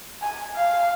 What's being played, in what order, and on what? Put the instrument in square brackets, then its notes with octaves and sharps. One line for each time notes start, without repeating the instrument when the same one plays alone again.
[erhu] G#5
F5